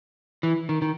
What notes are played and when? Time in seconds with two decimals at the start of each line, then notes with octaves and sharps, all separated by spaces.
0.43 E3
0.69 D#3
0.82 D#3